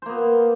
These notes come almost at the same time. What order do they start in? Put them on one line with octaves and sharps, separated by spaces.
C5 A#3 B3